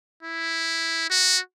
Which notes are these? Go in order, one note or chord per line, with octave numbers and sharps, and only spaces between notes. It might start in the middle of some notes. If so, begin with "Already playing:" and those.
E4
F#4